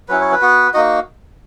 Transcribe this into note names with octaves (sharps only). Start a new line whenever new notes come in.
F#3 C#4 E4 B4
C#5
B4
B3 F#4
A#3 D#4 F#4 D#5